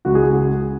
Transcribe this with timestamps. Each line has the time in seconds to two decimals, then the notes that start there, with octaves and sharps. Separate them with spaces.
0.05 C#2 F#4
0.15 G#4
0.23 F#4